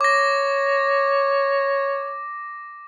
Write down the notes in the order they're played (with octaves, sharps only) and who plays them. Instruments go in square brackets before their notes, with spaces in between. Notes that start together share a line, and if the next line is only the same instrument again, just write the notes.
[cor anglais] C#5 [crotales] D6 A#6